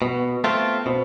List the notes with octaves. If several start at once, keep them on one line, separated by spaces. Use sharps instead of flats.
B2 B3
A3 C4 F4
B2 C4